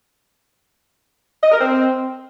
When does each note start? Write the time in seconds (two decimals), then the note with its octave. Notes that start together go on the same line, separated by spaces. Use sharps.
1.43 D#5
1.52 A#4
1.60 C4